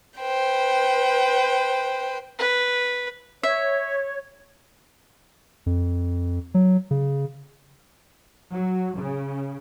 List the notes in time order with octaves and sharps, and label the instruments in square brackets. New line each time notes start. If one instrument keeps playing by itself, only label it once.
[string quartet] B4 C5 G5
[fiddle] B4
[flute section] C#5 [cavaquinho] E5
[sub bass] F2
F#3
C#3
[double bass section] F#3
C#3